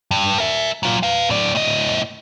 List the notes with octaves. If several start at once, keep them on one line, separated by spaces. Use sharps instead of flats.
G2
A#4 E5
F#3 F4
B4 F5
A2 D5
A2 D#5